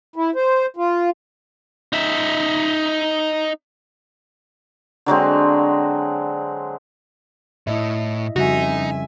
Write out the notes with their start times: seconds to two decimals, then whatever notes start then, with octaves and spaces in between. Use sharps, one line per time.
0.16 E4
0.35 C5
0.77 F4
1.93 D#4 E5
5.06 D3 F#3 G#3 C4
7.67 A2 E4 D#5 E5
8.36 F2 C#3 G3 D#4 F#4 E5 G#5